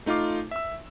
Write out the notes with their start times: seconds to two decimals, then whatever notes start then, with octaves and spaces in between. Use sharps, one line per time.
0.06 A3 D#4 F4 F5 D6
0.51 E5 E6